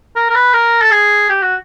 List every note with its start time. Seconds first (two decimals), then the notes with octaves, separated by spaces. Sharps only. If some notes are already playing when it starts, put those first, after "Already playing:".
0.16 A#4
0.30 A#4
0.35 B4
0.54 A#4
0.82 A4
0.91 G#4
1.29 G4
1.42 F#4